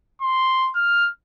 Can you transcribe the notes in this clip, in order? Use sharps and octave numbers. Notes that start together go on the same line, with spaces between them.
C6
F6